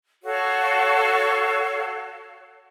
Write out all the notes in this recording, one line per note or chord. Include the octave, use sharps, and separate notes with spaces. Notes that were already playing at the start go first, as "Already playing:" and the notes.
F#4 A4 C#5 F5